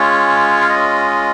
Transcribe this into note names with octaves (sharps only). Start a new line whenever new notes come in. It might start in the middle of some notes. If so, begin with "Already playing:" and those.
Already playing: G#3 C#4 F4 C#5
F5
D#5